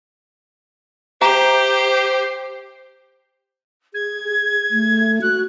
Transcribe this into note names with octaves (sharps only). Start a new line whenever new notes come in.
G4 C5 E5 A#5
G#4 G#6
G#4
A3
F#4 F#6